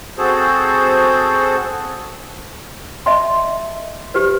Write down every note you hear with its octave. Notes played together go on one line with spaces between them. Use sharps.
C4 F#4 G#4 A4 C5
D#5 E5 A5 C6
G4 B4 C5